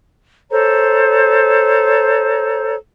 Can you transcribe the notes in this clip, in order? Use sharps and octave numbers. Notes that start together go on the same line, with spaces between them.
A4 C5 C#5 A#5